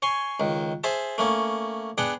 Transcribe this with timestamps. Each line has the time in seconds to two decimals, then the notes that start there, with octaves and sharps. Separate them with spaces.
0.02 C#5 G#5 C6
0.40 C#2 D#3
0.84 G#4 C5 E5 A5
1.18 A3 A#3 C#4
1.98 B3 D4 G#4 F#5 G5